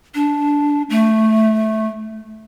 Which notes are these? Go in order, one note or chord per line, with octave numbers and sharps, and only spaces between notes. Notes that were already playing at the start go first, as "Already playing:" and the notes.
D4
A3